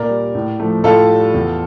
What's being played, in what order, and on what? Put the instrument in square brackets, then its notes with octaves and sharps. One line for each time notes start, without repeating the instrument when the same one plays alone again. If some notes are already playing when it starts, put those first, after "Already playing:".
Already playing: [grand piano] A#2 A#4 D5
G3
A2
F3 A3
A2 F4 A4
G3
E2